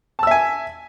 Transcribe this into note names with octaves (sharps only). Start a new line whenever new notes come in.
E5 G#5 A5 E6